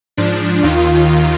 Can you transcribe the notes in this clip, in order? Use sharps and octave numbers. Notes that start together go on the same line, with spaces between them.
G#2 F3 D4
D#2 D#3 F4